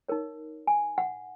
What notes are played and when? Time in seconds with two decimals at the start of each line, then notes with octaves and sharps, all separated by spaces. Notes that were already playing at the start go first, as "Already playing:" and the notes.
0.08 D#4 A#4 C#5
0.67 G#5
0.98 F#5